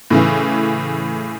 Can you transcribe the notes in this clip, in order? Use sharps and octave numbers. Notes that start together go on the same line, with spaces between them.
A2 C#3 E3